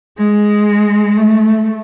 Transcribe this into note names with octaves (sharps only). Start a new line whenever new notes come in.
G#3
A3